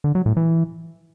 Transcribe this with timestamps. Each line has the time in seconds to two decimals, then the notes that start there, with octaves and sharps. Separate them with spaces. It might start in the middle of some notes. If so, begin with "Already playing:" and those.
0.04 D3
0.15 F#3
0.26 A2
0.37 E3